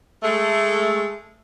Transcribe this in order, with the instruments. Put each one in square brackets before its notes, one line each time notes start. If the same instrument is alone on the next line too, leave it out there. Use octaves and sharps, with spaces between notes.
[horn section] G#3 A3